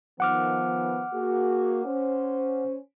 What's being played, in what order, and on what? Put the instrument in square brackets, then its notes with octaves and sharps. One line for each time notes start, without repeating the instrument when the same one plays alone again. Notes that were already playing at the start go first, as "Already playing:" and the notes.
[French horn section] D#3 F3 B3 [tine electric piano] F#5 D6 F6
[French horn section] A#3 F#4 G#4
C#4 C5